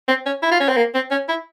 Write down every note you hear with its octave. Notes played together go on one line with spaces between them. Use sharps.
C4
C#4
E4
F4
C#4
C4
A#3
C4
C#4
E4